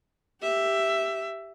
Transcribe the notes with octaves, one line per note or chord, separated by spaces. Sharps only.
G4 E5